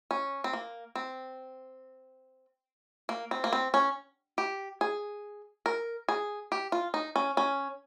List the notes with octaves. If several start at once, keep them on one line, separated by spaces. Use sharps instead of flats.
C#4
C4
A#3
C4
A#3
C4
A#3
C4
C#4
G4
G#4
A#4
G#4
G4
F4
D#4
C#4
C#4